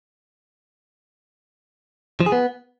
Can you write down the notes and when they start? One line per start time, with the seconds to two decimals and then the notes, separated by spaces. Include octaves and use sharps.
2.21 F3
2.26 G#4
2.32 B3